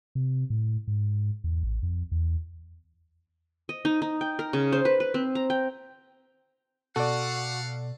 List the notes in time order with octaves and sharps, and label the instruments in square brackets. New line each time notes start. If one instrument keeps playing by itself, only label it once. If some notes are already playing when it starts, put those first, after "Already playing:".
[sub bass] C3
A2
G#2
E2
A1
F2
E2
[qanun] D#5
D#4
D#4
G5
A#4
C#3
C5
B4
B4
C4
A#5
G5
[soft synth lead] B2 [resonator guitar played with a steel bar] F#4 [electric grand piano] A4 D5 [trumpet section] F5 F#5